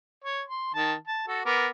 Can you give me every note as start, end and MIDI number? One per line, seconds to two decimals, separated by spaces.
0.24 0.42 73
0.47 0.72 84
0.74 0.94 51
0.74 0.94 81
1.07 1.23 81
1.27 1.41 66
1.27 1.41 69
1.45 1.68 59
1.45 1.68 70
1.45 1.68 86